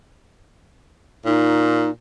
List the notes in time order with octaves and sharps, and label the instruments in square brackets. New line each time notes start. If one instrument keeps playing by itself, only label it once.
[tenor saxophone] A#2 [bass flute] D#4